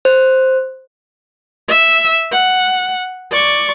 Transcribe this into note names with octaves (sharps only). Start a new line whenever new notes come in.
C5
E5
F#5
D5 C#6